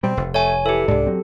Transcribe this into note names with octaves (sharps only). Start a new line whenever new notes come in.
B2 G3 C4
F1
A3 C#5 G#5
E3 G4 A4
C2 G#2 D4
F#3 C4